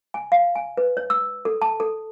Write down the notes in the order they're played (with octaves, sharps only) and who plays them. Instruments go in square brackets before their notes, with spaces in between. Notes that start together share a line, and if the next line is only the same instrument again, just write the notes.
[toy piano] G#5
F5
G#5
B4
C#5
E6
A4
A5
A4